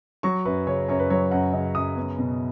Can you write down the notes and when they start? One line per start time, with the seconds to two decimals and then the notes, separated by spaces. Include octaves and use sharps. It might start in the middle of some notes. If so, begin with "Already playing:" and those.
0.23 F#3 C#6
0.45 F#2 B4
0.67 C#3 C#5
0.88 F#2 C#5
0.99 B4
1.10 F#3 C#5
1.31 F#2 F#5
1.53 C#3 D#5
1.75 F#2 D#6
1.97 B3
2.19 B2